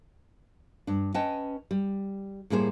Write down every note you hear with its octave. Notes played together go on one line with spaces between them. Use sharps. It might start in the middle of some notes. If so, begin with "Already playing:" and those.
G2 D4
C#4 B4 D#5 G5 A5
G3
A2 G3 A#3 G#4 A#4 C5